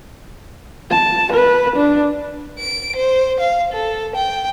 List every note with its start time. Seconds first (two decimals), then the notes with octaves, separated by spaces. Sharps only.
0.91 A5
1.33 B4
1.76 D4
2.59 D7
2.96 C5
3.40 F5
3.72 A4
4.15 G5